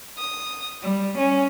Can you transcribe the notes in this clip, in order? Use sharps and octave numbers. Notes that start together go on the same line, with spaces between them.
D#6
G3
C#4